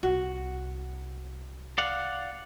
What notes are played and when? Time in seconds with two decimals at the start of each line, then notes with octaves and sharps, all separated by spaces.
0.03 C2 F#4
1.78 D5 F5 F#5